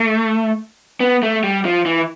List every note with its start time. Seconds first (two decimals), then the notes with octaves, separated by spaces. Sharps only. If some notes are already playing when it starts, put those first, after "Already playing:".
Already playing: A3
1.00 B3
1.23 A3
1.44 G3
1.65 F3
1.86 E3